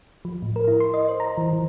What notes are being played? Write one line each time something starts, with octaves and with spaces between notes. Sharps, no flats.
F3
A2
A#4
E4
C6
D#5
C5
A#5
E3
E3